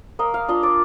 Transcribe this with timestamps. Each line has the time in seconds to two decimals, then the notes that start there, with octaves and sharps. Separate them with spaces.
0.19 A#3 D#5
0.34 F5
0.48 D4 F4 D#5
0.63 D5